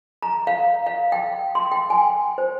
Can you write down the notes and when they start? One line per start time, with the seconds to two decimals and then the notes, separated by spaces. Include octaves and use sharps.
0.22 A#5
0.47 F5
0.86 F5
1.12 G5
1.55 C6
1.72 G5
1.90 G#5
2.38 C5